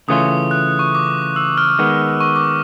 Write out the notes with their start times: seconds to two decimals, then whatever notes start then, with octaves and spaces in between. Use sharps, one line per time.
0.09 C#3 E3 A3 C#4 F4 D#6
0.51 F#6
0.79 C#6
0.95 D6
1.36 E6
1.58 F6
1.79 D#3 G#3 B3
2.21 C#6
2.36 D6